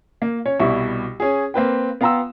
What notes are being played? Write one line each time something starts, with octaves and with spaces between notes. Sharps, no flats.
A#3
C#4 C#5
C2 B2 G3 E4 C#6
C#4 G#4
A#3 C4 B4 G5
B3 F5 G5 A#5 C6 E6